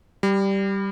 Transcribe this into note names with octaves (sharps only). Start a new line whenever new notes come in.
G3